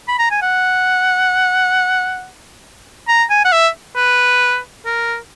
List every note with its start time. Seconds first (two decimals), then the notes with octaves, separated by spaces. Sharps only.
0.08 B5
0.19 A#5
0.31 G#5
0.42 F#5
3.08 A#5
3.30 G#5
3.45 F#5
3.52 E5
3.96 B4
4.86 A#4